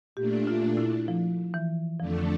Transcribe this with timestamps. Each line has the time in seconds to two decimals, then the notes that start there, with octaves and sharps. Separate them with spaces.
0.16 A#2 A3 D4 G4
0.47 F4
0.77 E4
1.08 F3
1.54 E3
2.00 F2 D3 F3 A3 D4